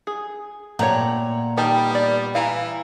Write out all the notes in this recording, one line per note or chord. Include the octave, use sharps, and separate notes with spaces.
G#4
A#2 A3 G4 C#5 F#5 A#5
D#3 G3 G5 A5
B3 D5
E3 F5 G#5 A#5